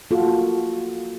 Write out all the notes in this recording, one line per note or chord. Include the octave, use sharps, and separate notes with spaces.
A#3 F4 F#4 A4